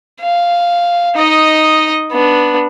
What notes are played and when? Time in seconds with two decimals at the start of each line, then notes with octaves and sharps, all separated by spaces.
0.21 F5
1.15 D#4 D#5
2.12 B3 D4